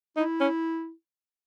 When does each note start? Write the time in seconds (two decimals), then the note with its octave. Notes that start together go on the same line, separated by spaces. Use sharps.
0.17 D#4 E4
0.41 C#4